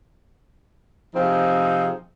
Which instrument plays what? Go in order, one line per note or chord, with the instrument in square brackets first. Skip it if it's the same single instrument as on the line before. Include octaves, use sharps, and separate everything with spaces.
[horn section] C3 F3 C4 D#4 G#4